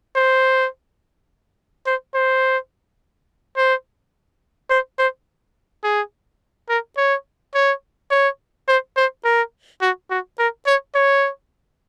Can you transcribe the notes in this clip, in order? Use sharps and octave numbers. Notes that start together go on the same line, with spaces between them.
C5
C5
C5
C5
C5
C5
G#4
A#4
C#5
C#5
C#5
C5
C5
A#4
F#4
F#4
A#4
C#5
C#5